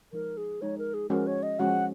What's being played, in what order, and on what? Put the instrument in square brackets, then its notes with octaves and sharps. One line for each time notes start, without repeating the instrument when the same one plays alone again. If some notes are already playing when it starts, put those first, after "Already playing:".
[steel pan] F3 G#3 D#4 [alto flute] A#4
[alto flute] G#4
[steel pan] F3 G#3 D#4 [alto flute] C#5
[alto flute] A#4
G#4
[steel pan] F3 G#3 C#4 F#4 [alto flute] A#4
[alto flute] C#5
D#5
[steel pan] F3 G#3 C#4 F#4 [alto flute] F#5